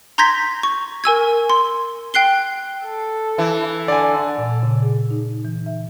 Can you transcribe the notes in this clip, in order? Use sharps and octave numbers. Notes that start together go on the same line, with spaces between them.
A#5 C6 G6 G#6 A#6 B6
C#6
A#4 G#5 E6 G#6
C6
G5 F#6 C7 G7
A4
E3
D3 D5 G#5
A#2
C#3
G#4
D#4
E3
E5